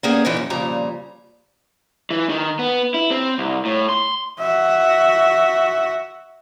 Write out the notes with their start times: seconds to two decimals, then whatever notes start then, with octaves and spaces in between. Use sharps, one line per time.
0.03 A#3 B3 C#4 G4 G#4 D5
0.25 A#2 E3 A#3 D#4 A#4 C#5
0.37 F#2
0.50 F2 A#2 C#3 G3 A#5
2.11 E3
2.29 D#3
2.59 B3
2.94 E4
3.11 C4
3.38 C2
3.65 A2
3.89 C6
4.40 F#4 E5